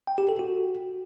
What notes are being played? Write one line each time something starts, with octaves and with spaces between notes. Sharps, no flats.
G5
G4
A4
F#4